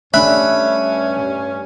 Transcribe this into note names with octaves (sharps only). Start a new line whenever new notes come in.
G2 A3 C#4 D4 E5 B5 F#6